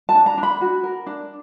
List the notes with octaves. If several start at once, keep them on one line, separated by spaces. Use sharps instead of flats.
A5
D4
A#5
D4
B5
F#4
A#4
D4